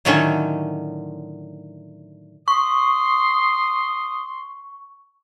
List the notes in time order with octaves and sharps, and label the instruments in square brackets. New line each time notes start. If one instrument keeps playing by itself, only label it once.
[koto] A2 D3 D#3 F#3 C#4
[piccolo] C6 [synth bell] C#6 [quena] D#6